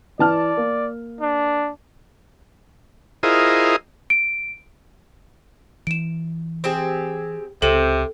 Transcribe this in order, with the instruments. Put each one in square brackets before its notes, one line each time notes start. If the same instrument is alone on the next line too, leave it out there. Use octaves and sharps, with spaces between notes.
[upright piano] E3 A5 F6 [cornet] D5
[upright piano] A#3
[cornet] D4
[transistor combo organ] E4 F4 G#4 A#4 C5 D#5
[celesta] D7
[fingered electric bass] E3 [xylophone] D7 E7
[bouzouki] C4 G4 G#4
[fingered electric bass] C#2 [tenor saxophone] C3 [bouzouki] C4 [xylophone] A4